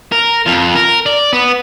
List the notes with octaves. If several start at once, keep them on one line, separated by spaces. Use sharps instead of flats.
A#4
F2 F4
A#4
D5
B3